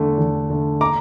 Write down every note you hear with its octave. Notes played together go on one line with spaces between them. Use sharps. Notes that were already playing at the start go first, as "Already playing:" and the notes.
Already playing: E2 D3 A3
E2
D3 A3
A#5 D6